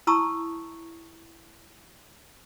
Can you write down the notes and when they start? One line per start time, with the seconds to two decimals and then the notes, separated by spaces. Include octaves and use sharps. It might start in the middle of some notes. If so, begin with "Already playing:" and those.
0.07 E4 A5 A#5 C#6 D#6 E6